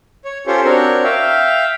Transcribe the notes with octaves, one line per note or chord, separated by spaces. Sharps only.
C#5
C#4 F4 G4 A4 C5 C#5
C4 D4 F#4 A#4 C#5
E5 F5 G5